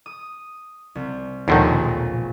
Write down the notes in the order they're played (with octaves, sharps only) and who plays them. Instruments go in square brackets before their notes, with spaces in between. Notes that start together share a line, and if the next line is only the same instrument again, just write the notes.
[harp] D#6
C2
[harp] A#1 B2 G#3 [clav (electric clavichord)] D#2 D3 D#3